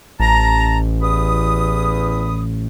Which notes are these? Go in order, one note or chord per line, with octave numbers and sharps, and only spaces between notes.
A1 A5 A#5
E2 B5 D#6